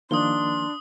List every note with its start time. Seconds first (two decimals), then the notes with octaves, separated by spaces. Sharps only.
0.11 D#3 F3 A#3 D4 C6 D#6 G7